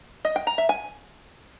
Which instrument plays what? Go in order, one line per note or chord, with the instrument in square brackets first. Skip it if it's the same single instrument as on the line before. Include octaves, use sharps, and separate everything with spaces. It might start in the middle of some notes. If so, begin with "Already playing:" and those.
[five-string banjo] D#5
G5
A#5
E5
G#5